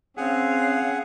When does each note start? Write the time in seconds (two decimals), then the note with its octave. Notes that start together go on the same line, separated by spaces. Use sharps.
0.17 C4 C#4 G#4 F5 F#5